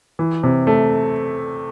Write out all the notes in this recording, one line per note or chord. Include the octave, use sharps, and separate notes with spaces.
E3
C3
A3